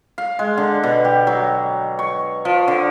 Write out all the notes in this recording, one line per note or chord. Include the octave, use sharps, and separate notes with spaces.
F5
G#3
D3
B2
G4
F#3
C#6
F3
D3